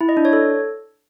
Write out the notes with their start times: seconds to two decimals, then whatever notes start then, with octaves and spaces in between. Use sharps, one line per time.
0.01 E4
0.09 D#5
0.17 D4
0.25 C#5
0.33 A4